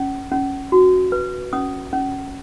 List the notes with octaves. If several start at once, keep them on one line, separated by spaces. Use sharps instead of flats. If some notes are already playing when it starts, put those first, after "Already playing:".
Already playing: C#4
C#4
F#4
B4
C#4 D#6
C#4